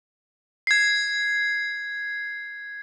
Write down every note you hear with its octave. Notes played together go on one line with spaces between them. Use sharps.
G#6 C7